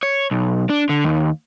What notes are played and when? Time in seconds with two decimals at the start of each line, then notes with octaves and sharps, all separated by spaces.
0.03 C#5
0.31 B1
0.70 D4
0.89 D3
1.04 D#2